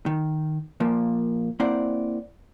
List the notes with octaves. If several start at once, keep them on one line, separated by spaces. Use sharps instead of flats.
D#3
A#2 F3 A#3
A#3 C4 E4 C5 D5 F#5